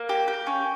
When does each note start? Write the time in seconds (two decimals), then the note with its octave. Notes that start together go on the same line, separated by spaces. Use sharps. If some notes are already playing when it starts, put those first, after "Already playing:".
Already playing: A#3
0.09 G4
0.28 G4
0.47 C#4